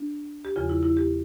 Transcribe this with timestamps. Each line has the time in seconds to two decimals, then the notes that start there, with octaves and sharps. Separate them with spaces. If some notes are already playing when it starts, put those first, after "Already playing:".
Already playing: D4
0.45 G4
0.56 E2 C#3 F3 F4
0.69 E4
0.83 E4
0.97 G4